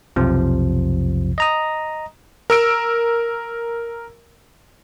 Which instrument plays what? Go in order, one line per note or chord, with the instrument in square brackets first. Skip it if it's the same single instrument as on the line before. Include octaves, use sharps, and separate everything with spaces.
[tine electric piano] B1 F2 C3 F3
D#5 A#5 D#6
[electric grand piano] A#4 E6 D7